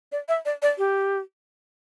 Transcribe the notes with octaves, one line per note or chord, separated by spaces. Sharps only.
D5
E5
D5
D5
G4